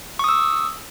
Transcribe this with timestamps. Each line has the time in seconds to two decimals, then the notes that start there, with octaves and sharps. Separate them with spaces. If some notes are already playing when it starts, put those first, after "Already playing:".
0.19 C#6
0.24 D#6
0.29 E6